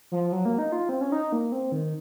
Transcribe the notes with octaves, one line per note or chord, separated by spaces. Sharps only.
F3
F#3
A#3
D#4
F4
C4
C#4
D#4
A#3
C4
D#3